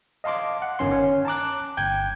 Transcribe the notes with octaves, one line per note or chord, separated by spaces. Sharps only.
D#5 F5 A5 C6 D6
F#5
G1 D#3 C#4 C6
C#4
A5 A#5 D6 F#6
G1 G5 G6 G#6